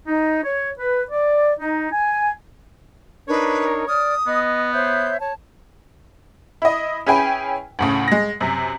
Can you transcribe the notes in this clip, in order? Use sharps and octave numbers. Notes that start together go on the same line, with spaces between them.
D#4
C#5
B4
D5
D#4
G#5
D4 D#4 A#4 B4 C#5
D5 D#6 F6
B3 D#5
C5 C#5 E5 G6
C#5 A5
E4 D#5
C#4 E4 G#4 B4 G5 G#5
D2 A2 C#3
G#3 A#6
F#2 C3